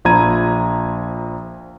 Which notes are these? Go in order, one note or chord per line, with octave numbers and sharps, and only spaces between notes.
A#1 F3 A#5 B5 G#6 D#7